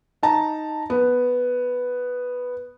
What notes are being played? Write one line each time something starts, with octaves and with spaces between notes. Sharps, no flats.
D#4 A5 A#5
B3